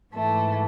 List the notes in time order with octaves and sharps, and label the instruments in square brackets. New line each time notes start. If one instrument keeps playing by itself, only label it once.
[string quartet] G#2 E3 A3